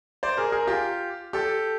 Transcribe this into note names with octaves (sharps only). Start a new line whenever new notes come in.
C5 D5
G#4 A#4
G#4 A#4
F4 G4
G4 A4